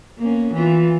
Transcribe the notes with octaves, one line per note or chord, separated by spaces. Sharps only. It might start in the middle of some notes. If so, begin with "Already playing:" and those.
A#3 B3 C#4
E3 F4